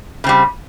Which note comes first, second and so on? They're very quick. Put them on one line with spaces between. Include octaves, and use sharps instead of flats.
C#3 C4 G3